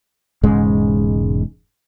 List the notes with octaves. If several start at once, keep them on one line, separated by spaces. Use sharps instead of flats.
E1 G#2 C#3 G#3